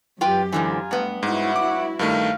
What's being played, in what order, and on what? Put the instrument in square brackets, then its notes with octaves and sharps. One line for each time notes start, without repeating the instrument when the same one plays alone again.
[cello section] F#2 G4 [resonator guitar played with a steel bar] F4 B4 G5
[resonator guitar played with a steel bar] G#2 D3 E3 [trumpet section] F4 G#5 A#5
[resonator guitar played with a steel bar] G2 B3 [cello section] A3
[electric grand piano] G#2 [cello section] E4 F#4 [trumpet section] C#5 F#5
[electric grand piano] D6
[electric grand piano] G2 D#3 A3 [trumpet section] F5